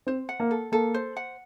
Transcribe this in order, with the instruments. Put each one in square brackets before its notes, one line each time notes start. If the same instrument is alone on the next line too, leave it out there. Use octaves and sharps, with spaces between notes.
[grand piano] C4 [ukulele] C5
[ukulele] F#5
[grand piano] A#3
[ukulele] A4
[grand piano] A#3 [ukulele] A4
[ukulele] C5
F#5